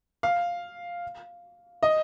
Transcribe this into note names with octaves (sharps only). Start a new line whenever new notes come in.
F5
D#5